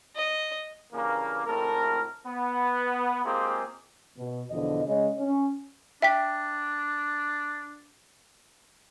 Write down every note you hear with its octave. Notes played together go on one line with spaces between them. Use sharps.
D#5
G2 C#3 E3 A#3
G#1 A2 C3 A4 A#4
B3
G#3 A#3 C4 F4 G4 G#4
B2
E2 B2 D3 F3 D#5
C#3 G#3 C#5 D#5
C#4
D4 E5 G5 B6